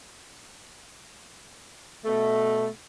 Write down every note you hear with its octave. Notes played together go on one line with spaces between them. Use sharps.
B2 A3